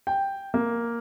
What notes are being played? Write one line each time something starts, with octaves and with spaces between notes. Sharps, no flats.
G5
A#3